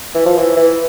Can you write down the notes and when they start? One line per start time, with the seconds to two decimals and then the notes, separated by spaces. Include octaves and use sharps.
0.15 E3
0.26 F3
0.39 E3
0.56 E3